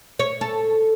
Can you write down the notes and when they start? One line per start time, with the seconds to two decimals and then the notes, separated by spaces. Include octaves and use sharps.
0.19 C#5
0.41 A4